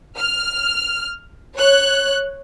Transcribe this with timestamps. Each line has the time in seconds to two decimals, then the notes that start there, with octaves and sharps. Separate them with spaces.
0.19 F6
1.55 C#5 F#6